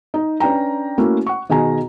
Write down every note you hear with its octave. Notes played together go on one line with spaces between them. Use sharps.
D#4
C#4 D4 B4 G5 A#5
A3 A#3 C#4 E4 F#4
F#5 C#6
B2 D#3 G#4 G#5 A#5